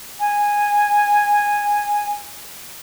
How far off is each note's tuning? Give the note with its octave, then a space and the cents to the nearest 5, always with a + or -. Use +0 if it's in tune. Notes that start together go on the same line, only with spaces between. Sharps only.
G#5 -10